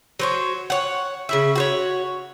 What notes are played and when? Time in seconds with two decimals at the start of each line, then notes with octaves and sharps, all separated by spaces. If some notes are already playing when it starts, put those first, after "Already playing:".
0.19 F#3 C5 C#5
0.70 C#5 F#5
1.29 C#3 E4 E5
1.56 F#4 C5 C#5